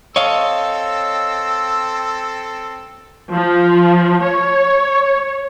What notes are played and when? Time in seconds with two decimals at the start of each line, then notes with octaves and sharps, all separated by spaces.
0.16 C4 A4 C#5 D#5 F5 E6
3.32 F3
4.24 C#5